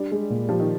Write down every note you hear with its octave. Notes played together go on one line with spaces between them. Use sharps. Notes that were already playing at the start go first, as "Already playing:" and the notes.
Already playing: G3 D4
G#3
A#2
F3 G4
D#3